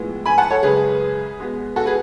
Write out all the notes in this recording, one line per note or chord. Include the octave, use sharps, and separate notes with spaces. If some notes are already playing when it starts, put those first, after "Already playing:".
Already playing: A2 F3 G#3 B3
G#5 B5
F#5 A5
A4 C#5
F#2 C#3 G#3 G#4 B4
B2 G#3 B3
F#4 A4
G#4 B4